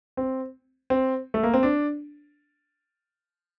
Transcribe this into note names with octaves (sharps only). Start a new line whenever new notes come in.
C4
C4
A3
A#3
C4
D4